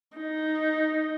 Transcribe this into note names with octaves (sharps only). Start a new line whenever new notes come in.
D#4